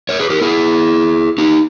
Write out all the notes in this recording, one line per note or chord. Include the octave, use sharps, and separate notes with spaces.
A#4 C#5
G#4 B4
G4 A#4
E4 G#4
D#4 G4